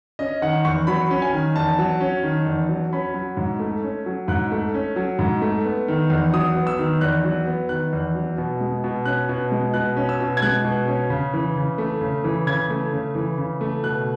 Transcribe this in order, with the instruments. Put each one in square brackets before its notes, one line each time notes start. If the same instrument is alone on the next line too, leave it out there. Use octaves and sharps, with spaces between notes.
[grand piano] C#4 D#5
D#3 F#5
E2 C#6
F#3 B5
C#4
G#5
D#3
E2 A5
F#3
C#4
D#3
E2
F#3
C#4 B5
F#3
G#2
A3
C#4
F#3
G#2 F#6
A3
C#4
F#3
G#2
A3
B3
D#3
E2
F#3 D#6
B3
E6
D#3
E2 F#6
F#3
B3
D#3 F#6
E2
F#3
B2
G#3
B2
C#4 F#6
B2
G#3
B2 F#6
C#4
E6
B2
G#6
G#3 F#6
B2
C#4
C#3
E3
C#3
A3
C#3
E3
C#3 G#6
A3
C#3
E3
C#3
A3
B2 F#6